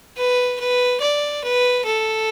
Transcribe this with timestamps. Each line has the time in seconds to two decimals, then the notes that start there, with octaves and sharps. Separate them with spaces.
0.17 B4
0.59 B4
1.01 D5
1.44 B4
1.85 A4